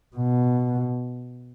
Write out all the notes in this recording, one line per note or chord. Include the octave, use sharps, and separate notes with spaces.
B2